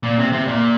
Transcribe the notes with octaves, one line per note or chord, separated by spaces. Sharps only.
A#2
C3
C3
A#2